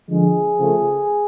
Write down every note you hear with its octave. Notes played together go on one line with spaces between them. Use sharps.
D3 F3 G#3 G#4
C#3 F3 A3